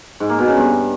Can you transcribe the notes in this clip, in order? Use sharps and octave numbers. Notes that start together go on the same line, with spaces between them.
G#2
A#3
B2
C#3
G2